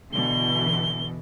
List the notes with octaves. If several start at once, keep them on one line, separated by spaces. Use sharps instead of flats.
B2 D3 E3 G7